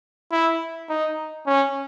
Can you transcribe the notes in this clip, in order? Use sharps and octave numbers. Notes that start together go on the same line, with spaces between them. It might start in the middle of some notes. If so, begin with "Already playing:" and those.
E4
D#4
C#4